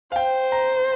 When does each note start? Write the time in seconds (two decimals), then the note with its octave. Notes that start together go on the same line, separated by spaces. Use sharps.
0.12 F5
0.16 C5 G5
0.52 A#5